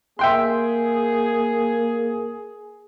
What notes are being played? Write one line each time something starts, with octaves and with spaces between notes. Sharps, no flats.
A#3 G#4 E5 G5 C6